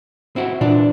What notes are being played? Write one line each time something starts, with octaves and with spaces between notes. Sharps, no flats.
C4 E4 F#4
A#2 E3 D4